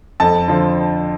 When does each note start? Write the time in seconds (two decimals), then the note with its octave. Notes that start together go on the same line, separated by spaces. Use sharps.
0.20 F2 A4 A5
0.48 D3 F3